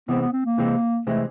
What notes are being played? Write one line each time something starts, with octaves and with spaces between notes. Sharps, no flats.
C3 E3 G#3 B3 C4
B3
C4
A#3
C3 E3 G#3 C4
C3 E3 G#3 A3 C4